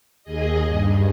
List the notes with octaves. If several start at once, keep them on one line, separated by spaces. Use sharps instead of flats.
D#2 G#4 D#5
G2